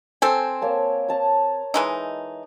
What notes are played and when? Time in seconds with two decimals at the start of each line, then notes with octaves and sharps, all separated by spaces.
0.22 C4 A4 C5 G#5 E6
0.62 A#3 C#5 A5
1.09 A5 A#5
1.74 E3 G#3 D#4